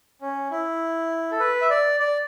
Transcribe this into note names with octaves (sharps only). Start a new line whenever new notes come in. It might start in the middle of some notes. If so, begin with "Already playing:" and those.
C#4
E4
A4
B4
E5
D5
D5